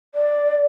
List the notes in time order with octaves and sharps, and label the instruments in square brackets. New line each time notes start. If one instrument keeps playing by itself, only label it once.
[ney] D5